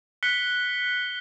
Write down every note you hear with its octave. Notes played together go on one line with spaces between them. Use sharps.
F#6 B6 C#7 G7